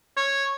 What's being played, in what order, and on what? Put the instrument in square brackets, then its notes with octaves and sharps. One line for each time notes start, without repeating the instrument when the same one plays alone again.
[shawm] C#5